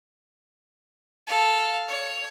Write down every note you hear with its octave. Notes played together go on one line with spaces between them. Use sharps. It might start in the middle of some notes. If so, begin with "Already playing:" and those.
A4 F5
C#5